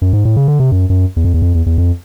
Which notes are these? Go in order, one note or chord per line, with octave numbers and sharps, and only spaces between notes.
F#2
G#2
A2
C#3
D3
C3
F#2
F#2
E2
F2
E2
F2
E2
E2
F2